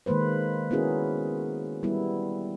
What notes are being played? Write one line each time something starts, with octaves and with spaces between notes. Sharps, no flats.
D#3 G#3 A#3 B4 C5
B3 C#4 E4 F#4 G#4 A#4
G3 B3 E4